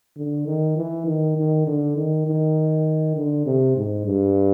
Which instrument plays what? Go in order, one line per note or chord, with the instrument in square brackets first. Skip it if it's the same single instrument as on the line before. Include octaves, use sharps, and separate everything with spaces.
[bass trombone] D3
D#3
E3
D#3
D#3
D3
D#3
D#3
D3
C3
G#2
G2